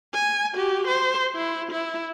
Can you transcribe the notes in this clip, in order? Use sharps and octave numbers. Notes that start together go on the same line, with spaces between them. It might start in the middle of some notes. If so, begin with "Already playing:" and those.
G#5
F#4 G4
C5
E4
E4